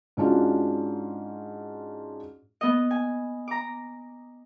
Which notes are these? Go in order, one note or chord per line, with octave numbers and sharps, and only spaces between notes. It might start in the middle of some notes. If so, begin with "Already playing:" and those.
G#2 C#4 D4 F4 F#4
B3 D#5
G#5
A#5 D6